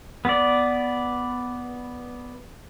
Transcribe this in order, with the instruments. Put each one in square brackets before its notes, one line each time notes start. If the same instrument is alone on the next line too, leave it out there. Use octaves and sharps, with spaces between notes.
[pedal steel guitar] B3 D5